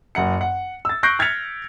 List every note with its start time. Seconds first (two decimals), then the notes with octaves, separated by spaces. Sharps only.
0.15 F#1 F#5 C#7
0.41 F#5
0.85 E6 A6
1.03 C#6 F#6 G6 A#6 C7 D7
1.19 F6 G#6 A6 B6 C#7 F7